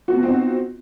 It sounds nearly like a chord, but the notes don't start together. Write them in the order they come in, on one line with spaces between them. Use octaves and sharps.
F#4 B3 F4 C4 D#4